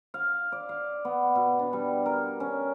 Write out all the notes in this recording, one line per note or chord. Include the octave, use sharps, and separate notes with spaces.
F5
D5
F5
B3
B2
D4
G3
A#4
C#4